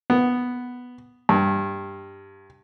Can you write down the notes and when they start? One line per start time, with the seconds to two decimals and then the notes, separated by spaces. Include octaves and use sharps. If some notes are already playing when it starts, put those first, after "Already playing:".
0.10 B3
1.29 G2